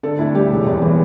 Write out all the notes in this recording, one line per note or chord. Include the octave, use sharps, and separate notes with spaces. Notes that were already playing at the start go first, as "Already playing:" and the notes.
D3 A4
D2 E4
G3 G4
E1
E2
E3